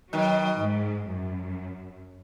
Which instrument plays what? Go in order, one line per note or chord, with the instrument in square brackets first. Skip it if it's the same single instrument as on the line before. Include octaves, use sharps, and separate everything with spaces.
[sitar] B2 D#3 [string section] F#3
[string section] G#2
F#2